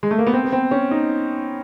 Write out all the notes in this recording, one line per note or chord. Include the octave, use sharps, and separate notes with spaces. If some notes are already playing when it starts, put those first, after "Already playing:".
G#3
A3
A#3
B3
C4
B3
C4
C#4
D#4